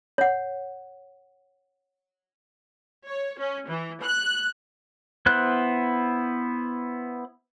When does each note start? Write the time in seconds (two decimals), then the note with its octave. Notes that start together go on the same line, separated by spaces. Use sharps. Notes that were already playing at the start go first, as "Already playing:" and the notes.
0.18 C#5 F#5
3.06 C#5
3.38 C#4
3.69 E3
4.01 F#6
5.26 B3 E4 C5 F#6